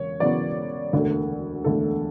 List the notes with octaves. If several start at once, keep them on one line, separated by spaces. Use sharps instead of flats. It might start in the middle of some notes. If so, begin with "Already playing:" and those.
Already playing: E1 C#3 C#5
E1 E2 C#3 F#3 B3 D5
E1 D2 D3 A3
E1 D2 D3 A3 A4